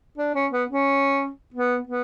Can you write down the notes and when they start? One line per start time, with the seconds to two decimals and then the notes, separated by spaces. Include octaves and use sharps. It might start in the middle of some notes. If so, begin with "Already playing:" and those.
0.18 D4
0.35 C#4
0.52 B3
0.69 C#4
1.54 B3
1.87 B3